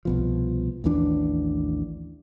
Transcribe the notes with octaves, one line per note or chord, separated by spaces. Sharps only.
C2 B2 F3
A1 D#2 E3 D4